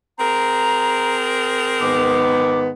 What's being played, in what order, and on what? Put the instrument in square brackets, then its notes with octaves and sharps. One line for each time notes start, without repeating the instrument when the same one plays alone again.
[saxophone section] C4 G#4 A#4 [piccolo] A#5
[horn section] G#2 D#3 B3 [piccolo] D6